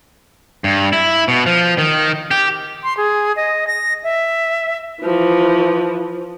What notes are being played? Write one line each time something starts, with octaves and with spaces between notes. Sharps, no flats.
G2
E4
B2
F3
D#3
G4
C6
G#4
D#5
A#6
E5
E3 F3